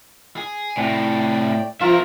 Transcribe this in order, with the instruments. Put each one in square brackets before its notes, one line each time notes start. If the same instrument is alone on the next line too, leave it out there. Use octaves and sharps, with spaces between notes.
[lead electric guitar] G#4
[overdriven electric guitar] A2 [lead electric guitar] C3 F#4 [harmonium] D5 G5
[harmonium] F3 [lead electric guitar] B3 A#5 [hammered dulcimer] F4 [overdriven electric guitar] A#4 E5